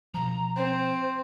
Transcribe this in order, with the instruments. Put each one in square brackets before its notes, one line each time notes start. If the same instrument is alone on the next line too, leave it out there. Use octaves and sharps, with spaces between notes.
[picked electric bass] B2 F3 [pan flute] A#5
[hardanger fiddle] C4 [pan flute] C5